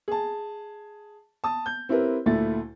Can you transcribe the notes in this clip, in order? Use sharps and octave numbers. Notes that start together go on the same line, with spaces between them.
G#4 A5
A5 D#6
G6
C4 E4 G4 A#4 B4
D2 A#2 A3 E4 A6